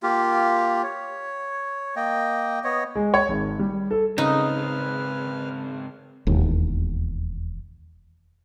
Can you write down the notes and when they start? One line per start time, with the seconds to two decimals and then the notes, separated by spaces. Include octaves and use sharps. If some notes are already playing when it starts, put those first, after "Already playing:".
0.03 A#3 F4 G4
0.83 C#5
1.96 A#3 D#5 G5
2.64 B3 C#5 D#5
2.96 G#3
3.14 C#5
3.29 G#1
3.59 G3
3.90 A4
4.18 G#2 C#3 C4 D#4 B4 F6
6.27 E1 D#2